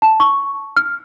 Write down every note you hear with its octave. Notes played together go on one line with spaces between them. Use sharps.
A5
C#6
F6